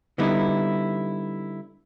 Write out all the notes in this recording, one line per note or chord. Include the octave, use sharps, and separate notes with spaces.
D3 G3 B3 D#4 E4